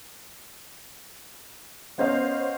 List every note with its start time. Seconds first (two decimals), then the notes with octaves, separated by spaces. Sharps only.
1.98 B3 C#4 C5 C#5 D#5 F5